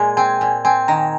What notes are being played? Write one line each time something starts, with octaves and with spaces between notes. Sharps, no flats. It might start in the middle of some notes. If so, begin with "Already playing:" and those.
Already playing: A#2 G#3 G#5
C4 G#5
A#2
C4 G#5
D#3 A#5